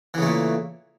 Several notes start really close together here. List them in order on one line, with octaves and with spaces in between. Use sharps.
E3 C#3 A3 A#2